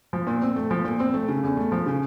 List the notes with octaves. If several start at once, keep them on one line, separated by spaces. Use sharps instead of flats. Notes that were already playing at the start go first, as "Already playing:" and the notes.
F3
A#2
C4
A3
F3
A#2
C4
A3
C#3
E2
A3
F3
C#3